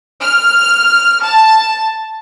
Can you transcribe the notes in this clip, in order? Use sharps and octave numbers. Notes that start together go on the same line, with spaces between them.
F6
A5